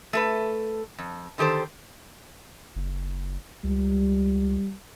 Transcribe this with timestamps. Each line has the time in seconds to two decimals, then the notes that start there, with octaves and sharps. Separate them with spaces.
0.13 A3 A4 B4
0.98 F2
1.38 D3 D#3 G4 A4 C5
2.76 F#1
3.64 C#2 G3